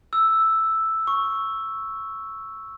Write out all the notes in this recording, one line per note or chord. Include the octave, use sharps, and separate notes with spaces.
E6
C#6